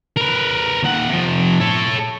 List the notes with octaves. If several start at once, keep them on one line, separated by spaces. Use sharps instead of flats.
A#4 B4
D#2 F#5
C3 F3
A4 C#5